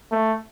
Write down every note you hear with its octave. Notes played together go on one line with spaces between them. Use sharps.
A3